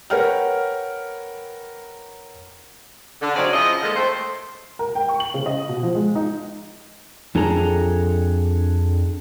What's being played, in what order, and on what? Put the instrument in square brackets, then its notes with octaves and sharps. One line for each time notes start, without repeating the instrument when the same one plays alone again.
[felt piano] A#4 B4 C#5 F#5 G5 F6
[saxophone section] D3
C#3 F#3 C4 C#4 D#4 D5
C#3 F3 E4 F4 D#5
D#3 F3 G#3 A#3 D#4 A4
A3 C4 C5
[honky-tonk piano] A#4
G5
C#6
F#7
C#3
D#5
B2
F3
G#3
D#4
[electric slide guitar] F2 D4 G#4 A4 A#5